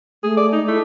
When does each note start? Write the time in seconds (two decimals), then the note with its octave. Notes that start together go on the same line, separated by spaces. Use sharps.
0.23 A3 G#4
0.37 D5
0.52 D#4
0.68 A3 E4